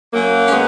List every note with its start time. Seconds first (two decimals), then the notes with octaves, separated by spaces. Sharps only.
0.13 F#2 F#3 A#3
0.46 C#4
0.51 D#3 G#3 B3